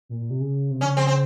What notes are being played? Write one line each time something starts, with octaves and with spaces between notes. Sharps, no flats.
A#2
A#2
C3
C#3
C3
C#3 C#4
C4
C4